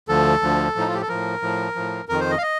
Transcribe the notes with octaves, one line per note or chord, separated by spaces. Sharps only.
D2 D3 F3 A4
D2 D3 F3
A2 F3 D#4
F4
G4
A4
A2 F3 A#4
A2 F3
A2 F3
F2 D#3 A#4
C5
D#5
F5
D#5